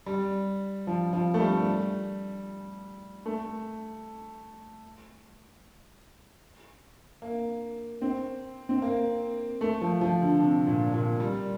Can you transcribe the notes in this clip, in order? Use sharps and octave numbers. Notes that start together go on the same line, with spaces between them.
G3
F3
F3
A3
G3
A3
A#3
C4
C4
A#3
A3
F3
F3
D3
C3
A#2
A#2
G3